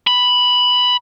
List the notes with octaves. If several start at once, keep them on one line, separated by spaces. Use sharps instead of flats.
B5